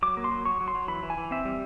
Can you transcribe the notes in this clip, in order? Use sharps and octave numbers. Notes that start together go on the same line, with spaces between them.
F#3 D6
A#3
C6
F#3
F#3 C#6
F#3
C6
F#3
E3 B5
E3
G#5
E3
C4 E5
G3